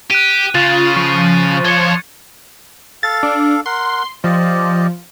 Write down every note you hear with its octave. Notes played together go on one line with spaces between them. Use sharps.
G4 F#6 D#7
C#3 F4 A6
F3 C#6 C7
C#5 C6 G#6 C#7
A4 F5 A6
D4
A#4 F#5 C6
F3 G4 D5 D#5